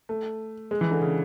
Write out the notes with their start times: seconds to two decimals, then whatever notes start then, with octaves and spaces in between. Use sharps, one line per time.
0.09 A3
0.71 G#3
0.81 E3
0.91 D3
1.02 C#3